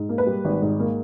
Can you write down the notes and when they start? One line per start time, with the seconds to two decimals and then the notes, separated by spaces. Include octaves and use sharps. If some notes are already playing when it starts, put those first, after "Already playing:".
Already playing: G#2
0.09 A#3
0.18 B4
0.26 G3
0.44 G#1
0.62 G#2
0.79 A#3